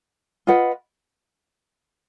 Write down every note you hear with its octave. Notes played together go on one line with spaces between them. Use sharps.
F4 B4 D#5 F#5